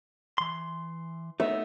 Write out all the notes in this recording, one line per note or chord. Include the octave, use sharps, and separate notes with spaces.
E3 C6
A3 B3 D#4 E5